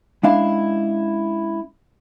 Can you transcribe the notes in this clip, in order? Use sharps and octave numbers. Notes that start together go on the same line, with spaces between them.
G#3 C#4 D4 E4 F5